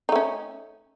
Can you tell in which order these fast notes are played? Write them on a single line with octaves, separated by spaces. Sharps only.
D#4 A3 C#4